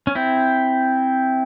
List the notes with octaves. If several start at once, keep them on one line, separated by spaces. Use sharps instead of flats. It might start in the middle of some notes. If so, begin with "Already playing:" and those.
C#4
C4 E4